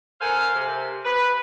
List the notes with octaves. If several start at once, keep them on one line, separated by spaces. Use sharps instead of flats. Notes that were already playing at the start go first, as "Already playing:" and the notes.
A4 A#4 C5 F5 F#5 G#5
C3
B4